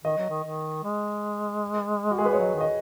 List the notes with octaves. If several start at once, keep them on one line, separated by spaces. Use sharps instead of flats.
D#3 D#5
F#3
D#3
D#3
G#3
F#4
G#4
B4
C#5
F#3 D#5
D#3
D#5